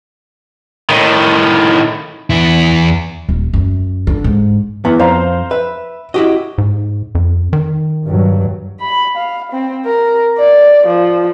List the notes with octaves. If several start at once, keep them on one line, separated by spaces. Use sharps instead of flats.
A2 D#3
E2 E4
D#1
F#2
D3
G#2
E2 B3
F2 C5 F5 A#5
B4 E5
E4 F#4 G4 D#5
G#2
F2
D#3
G2 F#3
B5
F5
C4
A#4
D5
F3